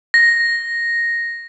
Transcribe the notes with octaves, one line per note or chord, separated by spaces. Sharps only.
A#6